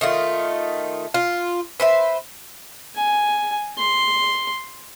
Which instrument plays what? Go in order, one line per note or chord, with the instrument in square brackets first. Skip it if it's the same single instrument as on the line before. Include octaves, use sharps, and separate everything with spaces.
[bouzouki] D#3 A3 F4
F4
B4 C5 E5
[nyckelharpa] G#5
C6